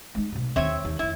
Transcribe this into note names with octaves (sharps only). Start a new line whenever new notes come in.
G#3 D#4
B1 B2
D#2 D#3 C4 C#5 E5
D#2
F2 D3 E4